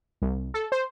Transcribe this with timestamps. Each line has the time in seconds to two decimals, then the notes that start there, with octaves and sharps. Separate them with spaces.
0.22 C2
0.54 A4
0.72 C5